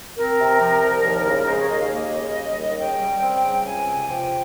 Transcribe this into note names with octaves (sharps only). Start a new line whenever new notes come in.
C4 A#4
C3
F3
C2
D#2
C#3
G#3 C5
C#5
D#2 D#5
F5
A#3 D#5
C#3
G3
D#2
C#3 G5
G3
C4
C#3
C#2 G#5
C3
F3 G5